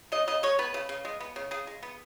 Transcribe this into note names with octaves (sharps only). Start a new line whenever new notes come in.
C#3 D#5
C#3 D#5
G#3 C#5
B3 B4
C#3
C#3
G#3
B3
C#3
C#3 G#4
G#3
B3